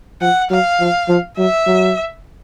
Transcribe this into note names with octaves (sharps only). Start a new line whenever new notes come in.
F3 F#5
F#3 F5
F3
F3
F#3 E5
F#3